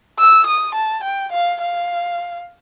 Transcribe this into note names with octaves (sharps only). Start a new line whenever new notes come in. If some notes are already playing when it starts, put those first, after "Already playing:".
E6
D#6
A5
G5
F5
F5